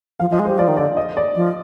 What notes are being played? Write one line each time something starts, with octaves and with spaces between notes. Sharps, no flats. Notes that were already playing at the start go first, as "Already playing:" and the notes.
F3 F5
F3 D#5
G#3
C5
G3
F3 D5
D#3
D3 D5
D#5
D5
F3